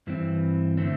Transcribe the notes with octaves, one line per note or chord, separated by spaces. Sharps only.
G2 E3 C4
D3 A3 C4